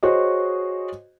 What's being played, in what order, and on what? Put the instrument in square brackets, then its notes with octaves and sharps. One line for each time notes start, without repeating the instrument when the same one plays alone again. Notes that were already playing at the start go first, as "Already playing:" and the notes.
[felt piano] F#4 G#4 C5 C#5 D#5